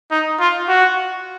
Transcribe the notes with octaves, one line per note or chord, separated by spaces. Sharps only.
D#4
F4
F#4